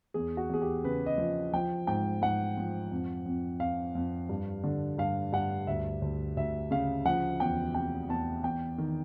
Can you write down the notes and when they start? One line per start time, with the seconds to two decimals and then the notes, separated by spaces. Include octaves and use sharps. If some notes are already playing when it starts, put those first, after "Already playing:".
0.14 E2 G#4
0.37 F#4
0.50 E2 G#4
0.61 G4
0.84 C#3 B4
1.06 D#5
1.18 F3
1.53 F3 G5
1.87 G#2 G5
2.22 G#2 F#5
2.57 F3
2.91 F2
3.26 F2
3.60 F2 F5
3.95 F2
4.29 G2
4.63 D3
4.98 G2 F5
5.33 G2 F#5
5.67 D2 E5
6.02 D2
6.37 D2 E5
6.71 C#3 F5
7.05 F3 F#5
7.40 E2 G5
7.74 C3 G5
8.09 E2 A5
8.44 E2 G5
8.78 D#3